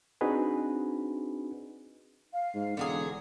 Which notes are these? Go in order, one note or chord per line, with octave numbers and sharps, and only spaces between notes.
C4 D4 D#4 F#4 G#4 B4
F5
G#2
E1 D3 F#3 G#4